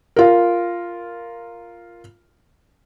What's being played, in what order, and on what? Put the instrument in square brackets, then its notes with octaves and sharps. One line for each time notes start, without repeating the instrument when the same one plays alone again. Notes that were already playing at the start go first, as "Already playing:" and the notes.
[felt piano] F4 A#4